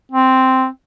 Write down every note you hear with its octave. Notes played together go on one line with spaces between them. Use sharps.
C4